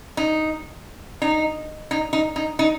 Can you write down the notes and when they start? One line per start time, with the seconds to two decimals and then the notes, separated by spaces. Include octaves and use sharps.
0.17 D#4
1.22 D#4
1.91 D#4
2.13 D#4
2.36 D#4
2.59 D#4